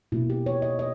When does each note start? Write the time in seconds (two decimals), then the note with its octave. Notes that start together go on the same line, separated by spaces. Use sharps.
0.12 B2 A#3 E4
0.30 G4
0.46 C#5
0.62 D#5
0.79 D#5